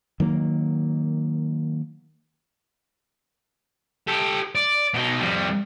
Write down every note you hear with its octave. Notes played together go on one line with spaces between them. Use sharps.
D#3 F#3 A#3
G4 A4
D5
B2 D#4
F2 G3